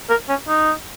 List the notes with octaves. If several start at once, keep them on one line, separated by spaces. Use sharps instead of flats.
A#4
C#4
D#4